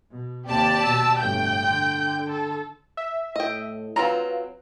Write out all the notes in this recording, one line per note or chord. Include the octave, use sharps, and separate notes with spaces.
B2
D#2 C3 G4 D5 A5
B2 E6
G1 A2 G5 G6
D3
A4
E5
A2 D#5 G5
F#3 C4 F4 B4 A#5